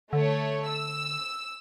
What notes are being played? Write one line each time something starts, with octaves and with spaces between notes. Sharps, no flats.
D3 A3 C#5
E6